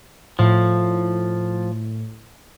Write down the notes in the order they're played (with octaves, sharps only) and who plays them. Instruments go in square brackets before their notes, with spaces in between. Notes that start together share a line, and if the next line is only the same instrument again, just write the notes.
[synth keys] A2 [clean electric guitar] F3